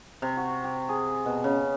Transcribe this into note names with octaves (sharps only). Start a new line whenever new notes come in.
C3
F#4
G4
G#4
B2
C#3